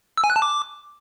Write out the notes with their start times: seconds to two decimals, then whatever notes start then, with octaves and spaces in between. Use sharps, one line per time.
0.17 E6
0.24 G#5
0.30 F#6
0.36 A5
0.42 D6